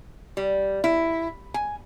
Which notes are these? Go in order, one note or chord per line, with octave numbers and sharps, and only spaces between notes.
G3
E4
G#5